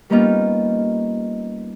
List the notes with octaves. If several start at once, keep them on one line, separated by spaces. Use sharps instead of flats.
G3 A#3 B3 C#4 D#4 F4